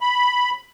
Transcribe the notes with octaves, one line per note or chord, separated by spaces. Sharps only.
B5